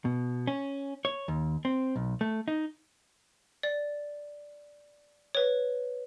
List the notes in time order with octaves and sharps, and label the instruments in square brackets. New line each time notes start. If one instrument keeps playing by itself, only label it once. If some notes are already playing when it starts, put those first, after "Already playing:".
[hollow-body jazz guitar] B2
C#4
C#5
D#2
C4
B1
A3
D#4
[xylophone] D5
B4 C#5